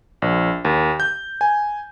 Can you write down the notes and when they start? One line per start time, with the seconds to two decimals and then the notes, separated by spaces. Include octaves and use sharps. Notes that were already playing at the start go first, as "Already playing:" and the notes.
0.22 A#1
0.65 D#2
1.00 G6
1.41 G#5